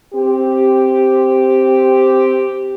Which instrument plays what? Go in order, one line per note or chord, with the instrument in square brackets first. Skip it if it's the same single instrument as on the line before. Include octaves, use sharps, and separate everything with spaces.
[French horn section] C4 G4